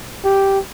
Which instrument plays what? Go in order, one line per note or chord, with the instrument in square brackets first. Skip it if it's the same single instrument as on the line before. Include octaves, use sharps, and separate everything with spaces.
[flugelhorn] G4